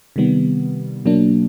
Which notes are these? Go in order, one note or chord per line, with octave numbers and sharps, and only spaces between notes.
C3 D#3 G3 B3
B2 F#3 A#3 D4